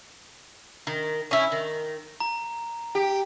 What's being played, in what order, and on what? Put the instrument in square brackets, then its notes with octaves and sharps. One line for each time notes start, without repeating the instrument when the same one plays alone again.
[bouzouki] D#3
C#4 E4
D#3
[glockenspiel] A#5
[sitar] G4